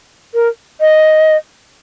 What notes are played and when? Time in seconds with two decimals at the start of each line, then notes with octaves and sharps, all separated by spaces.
0.34 A#4
0.81 D#5